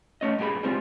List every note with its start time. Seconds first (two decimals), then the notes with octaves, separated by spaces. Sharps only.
0.21 A3 C#4 D#5
0.39 G2 A#2 G4 G#4 B5
0.63 G3 G#3 C4 F4